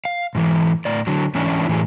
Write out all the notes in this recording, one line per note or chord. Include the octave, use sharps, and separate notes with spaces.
F5
G#2 E3
A2 D5
D3 F#3
G#2 E3 C#4 D4 E4
A2 E3 F#3 G#4